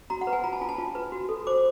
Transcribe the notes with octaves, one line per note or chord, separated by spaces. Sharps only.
F#4 A#5
F#5
B4
G#5
F4 A#5
A5
F4 G#5
A5
F4
B4
F#4
A4
C5 D6